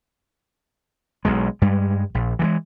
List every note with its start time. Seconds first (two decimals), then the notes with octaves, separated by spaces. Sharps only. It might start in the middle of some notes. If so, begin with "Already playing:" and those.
1.25 B1 B2 G#3
1.62 G2 G3 G#3
2.14 A#1
2.39 E3 F#3 G#3